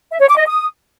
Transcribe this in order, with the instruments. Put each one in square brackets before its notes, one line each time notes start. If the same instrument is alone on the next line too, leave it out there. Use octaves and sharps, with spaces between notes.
[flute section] E5
C#5
D6
D#5
D#6